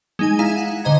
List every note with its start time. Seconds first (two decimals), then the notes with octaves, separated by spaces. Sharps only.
0.19 G#3 D#4 G#5
0.39 D#4 E4 F5 G#5 A#5
0.57 F#5
0.84 D3 C5 D#5 A#5 G#6